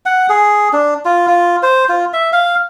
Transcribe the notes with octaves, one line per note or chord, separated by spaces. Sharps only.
F#5
G#4
D4
F4
F4
C5
F4
E5
F5